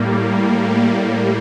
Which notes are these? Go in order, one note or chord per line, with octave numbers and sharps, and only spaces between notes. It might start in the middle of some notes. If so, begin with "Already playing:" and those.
Already playing: A2 G3 A#3